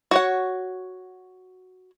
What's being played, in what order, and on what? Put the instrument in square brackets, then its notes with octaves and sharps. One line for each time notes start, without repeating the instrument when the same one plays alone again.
[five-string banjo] F#4 C#5 F#5